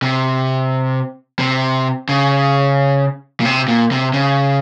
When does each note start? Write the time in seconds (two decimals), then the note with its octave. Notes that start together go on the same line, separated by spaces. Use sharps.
0.03 C3
1.39 C3
2.09 C#3
3.40 A#2
3.45 C3
3.68 A#2
3.91 C3
4.13 C#3